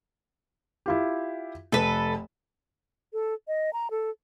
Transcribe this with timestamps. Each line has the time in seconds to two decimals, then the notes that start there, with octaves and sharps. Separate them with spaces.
0.86 E4 F4 G4
1.72 F1 A4 B4
3.13 A4
3.48 D#5
3.73 A#5
3.91 A4